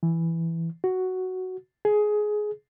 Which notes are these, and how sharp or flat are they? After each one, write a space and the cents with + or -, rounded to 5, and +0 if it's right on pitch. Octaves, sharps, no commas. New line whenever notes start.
E3 +5
F#4 +5
G#4 +15